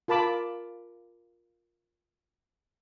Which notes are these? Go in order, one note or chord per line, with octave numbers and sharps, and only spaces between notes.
F4 A#4 A5 B5 D6